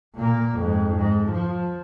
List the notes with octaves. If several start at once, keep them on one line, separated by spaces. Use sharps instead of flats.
A#2 A#3
F2 G#2
G#2
F3